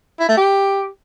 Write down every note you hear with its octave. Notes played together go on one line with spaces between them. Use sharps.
E4
A3
G4